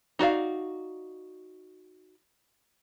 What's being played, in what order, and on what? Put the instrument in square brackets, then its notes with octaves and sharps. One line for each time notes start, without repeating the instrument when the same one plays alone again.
[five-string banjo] D#4 F#4 D5 F5